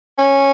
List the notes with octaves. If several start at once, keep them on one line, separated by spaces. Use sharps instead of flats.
C#4